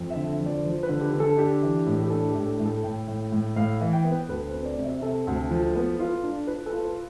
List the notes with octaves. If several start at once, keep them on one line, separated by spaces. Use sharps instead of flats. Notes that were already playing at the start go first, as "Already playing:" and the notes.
Already playing: F2
E5
D3
F3
D5
F3 C5
B4
D3
G4
D3
A4
D4 G4
E3
A2
G4
D4 A4
G4
A2
A4
A2
A4
A2 G5
A2
A2
A2 F5
E3
G5
B3
B4
D2 B4
C5
C4
D5
C3
E5
C3 A4
D2
F3
B3
F4
D4
F4 B4
A4
F4
B4